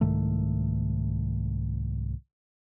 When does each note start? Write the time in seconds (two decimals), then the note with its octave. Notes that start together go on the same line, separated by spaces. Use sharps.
0.01 C2 G#2 D#3 A3